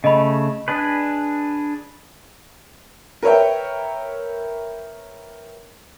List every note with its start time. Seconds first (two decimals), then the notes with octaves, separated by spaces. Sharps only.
0.04 C#3 A3 D#5 B5
0.68 D4 G#4 B4
3.23 A#4 B4 C#5 E5 G5